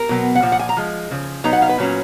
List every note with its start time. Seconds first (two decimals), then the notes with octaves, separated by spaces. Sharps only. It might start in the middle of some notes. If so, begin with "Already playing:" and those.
Already playing: A#4
0.09 B2 F#3 B3
0.35 F#5
0.42 A#2 F3
0.52 F#5
0.59 G#5
0.69 A#5
0.77 F3 G#3
1.11 C#3 F3
1.44 B2 F#3 B3 D#4 A#5
1.53 F#5
1.62 F5
1.69 B4
1.78 A#2 F#3 C#4